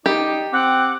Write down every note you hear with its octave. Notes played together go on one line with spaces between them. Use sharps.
D#4 G4 D5
C4 F#5 D6